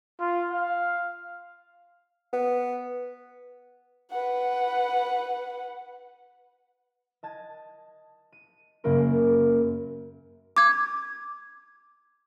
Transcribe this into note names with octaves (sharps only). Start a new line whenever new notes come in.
F4
F5
B3
B4 F#5
D#5 A5 G#6
D#7
F#2 C#3 A#3 C#4 A#4 D7
D6 G#6